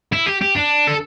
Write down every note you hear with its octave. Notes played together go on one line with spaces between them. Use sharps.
E4
G4
G4
D4
A4